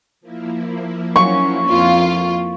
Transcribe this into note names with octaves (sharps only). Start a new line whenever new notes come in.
F3 A#3 E4
F#3 C#4 C#6
F2 F4